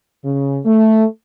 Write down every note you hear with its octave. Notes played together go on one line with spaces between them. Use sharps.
C#3
A3